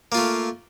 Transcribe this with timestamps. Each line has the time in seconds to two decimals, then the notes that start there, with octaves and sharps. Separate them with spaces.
0.12 A#3
0.15 F4
0.17 A3